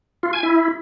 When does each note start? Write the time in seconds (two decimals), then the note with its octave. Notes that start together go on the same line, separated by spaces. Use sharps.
0.23 F4
0.33 G#5
0.43 E4